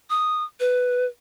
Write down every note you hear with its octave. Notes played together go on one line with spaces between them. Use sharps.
D#6
B4